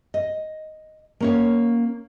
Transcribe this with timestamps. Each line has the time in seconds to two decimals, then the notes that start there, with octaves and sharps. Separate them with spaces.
0.14 D#5
1.21 A#3 C#4 C#5